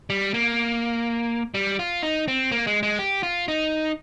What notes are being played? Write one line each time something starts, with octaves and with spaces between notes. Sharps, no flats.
G3
A#3
G3
F4
D#4
C4
A#3
G#3
G#3
G4
F4
D#4